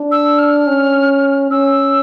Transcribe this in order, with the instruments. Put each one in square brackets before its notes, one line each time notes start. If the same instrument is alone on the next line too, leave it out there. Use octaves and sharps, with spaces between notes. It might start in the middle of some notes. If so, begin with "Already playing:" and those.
Already playing: [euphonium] D4
[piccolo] E6
F6
[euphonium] C#4
[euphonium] C#4 [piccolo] E6